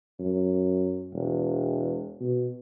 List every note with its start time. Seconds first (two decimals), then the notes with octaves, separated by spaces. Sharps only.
0.19 F#2
1.13 E1
2.20 B2